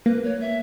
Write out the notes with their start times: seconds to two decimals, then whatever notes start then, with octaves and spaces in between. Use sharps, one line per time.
0.05 A#3 B4
0.24 C#5
0.41 E5